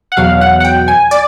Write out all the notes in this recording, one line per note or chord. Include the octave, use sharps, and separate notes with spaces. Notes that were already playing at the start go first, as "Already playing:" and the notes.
F#5
E2 B2 F#3 F5
F#5
F#5
G5
G#5
D5